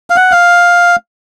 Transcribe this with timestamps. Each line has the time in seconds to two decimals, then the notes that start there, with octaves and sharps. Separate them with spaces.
0.10 F5
0.16 F#5
0.32 F5